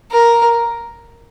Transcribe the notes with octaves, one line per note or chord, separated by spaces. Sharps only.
A#4